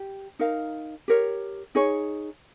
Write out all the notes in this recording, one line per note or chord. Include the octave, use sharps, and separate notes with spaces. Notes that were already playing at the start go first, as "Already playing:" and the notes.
Already playing: G4
D#4 A#4 F5
G4 A#4 C#5
D#4 G#4 C#5